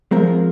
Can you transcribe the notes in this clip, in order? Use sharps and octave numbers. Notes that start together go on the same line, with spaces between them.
F3 G#3 C4 A#4